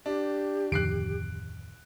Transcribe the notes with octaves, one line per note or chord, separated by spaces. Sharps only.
D4 G4
D1 F2 D#3 F#6 C7 D7